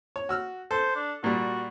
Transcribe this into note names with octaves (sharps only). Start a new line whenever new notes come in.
C#5
F#4 E6 F6
A4 C5
D4
A#2 G3 F#4